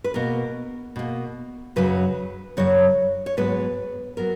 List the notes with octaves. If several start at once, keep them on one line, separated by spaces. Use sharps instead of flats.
B4
B2 A#3 A#4
B2 A#3
F#2 C#3 F#3 B4
F#2 C#3 F#3 C#5
C#5
G#2 F#3 B3 B4
F#3 B3 A#4